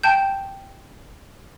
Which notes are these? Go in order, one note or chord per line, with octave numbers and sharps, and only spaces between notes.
G5 A5 G6